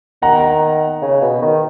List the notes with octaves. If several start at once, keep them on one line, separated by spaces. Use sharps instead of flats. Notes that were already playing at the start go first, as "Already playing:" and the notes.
D#3 F#5 A#5
C#3
B2
D#3